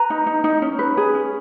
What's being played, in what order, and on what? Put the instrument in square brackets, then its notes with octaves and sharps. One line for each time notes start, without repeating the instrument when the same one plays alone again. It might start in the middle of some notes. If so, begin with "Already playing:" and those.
Already playing: [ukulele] B4 A#5
D#4
D#4
D#4
C#4
B4
G#4
C#4